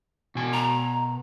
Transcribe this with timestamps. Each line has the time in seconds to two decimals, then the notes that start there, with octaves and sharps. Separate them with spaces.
0.35 B2 G#5
0.53 A#5